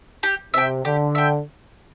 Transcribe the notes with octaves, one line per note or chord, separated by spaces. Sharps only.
G4
C3 E5 G5
D3 G4
E5 G5